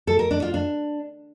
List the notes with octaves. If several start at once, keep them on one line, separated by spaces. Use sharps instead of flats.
A4
A#4
D4
F4
D4